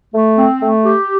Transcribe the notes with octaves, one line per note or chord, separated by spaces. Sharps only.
A3
C4
A3
G4